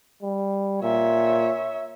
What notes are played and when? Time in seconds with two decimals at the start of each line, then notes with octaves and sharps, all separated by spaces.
0.23 G3
0.83 A#2 C#5 E5